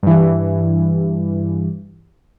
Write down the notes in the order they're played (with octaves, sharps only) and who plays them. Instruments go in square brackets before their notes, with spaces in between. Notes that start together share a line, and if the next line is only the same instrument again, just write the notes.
[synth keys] G2 E3